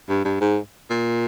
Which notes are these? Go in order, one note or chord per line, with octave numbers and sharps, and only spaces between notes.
G2
G2
G#2
A#2